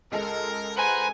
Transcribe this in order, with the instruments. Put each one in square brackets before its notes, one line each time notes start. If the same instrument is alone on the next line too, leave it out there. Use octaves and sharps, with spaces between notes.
[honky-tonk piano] C#2 G#3 A4 [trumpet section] A#4
[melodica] B4 C5 A#5 [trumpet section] F#5 [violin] G#5